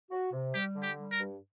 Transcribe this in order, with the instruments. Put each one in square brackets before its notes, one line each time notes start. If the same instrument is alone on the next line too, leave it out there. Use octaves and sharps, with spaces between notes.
[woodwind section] F#4
C3
[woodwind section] G3 [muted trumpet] G4
[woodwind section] D3
[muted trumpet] G4
[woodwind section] G3
[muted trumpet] A#4
[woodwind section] G2